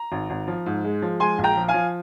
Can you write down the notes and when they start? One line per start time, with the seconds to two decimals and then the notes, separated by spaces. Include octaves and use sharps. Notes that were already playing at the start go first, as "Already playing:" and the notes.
Already playing: A#5
0.12 G#1
0.30 G#1
0.48 F3
0.66 G#2
0.84 G#3
1.02 F3
1.20 G#3 G#5 C6
1.38 A#1
1.44 G5 A#5
1.57 F3
1.68 F5 G#5
1.74 F3